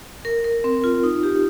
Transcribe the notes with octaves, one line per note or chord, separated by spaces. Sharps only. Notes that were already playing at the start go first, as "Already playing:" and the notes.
A#4
A#4
C4
F4
D#4
G4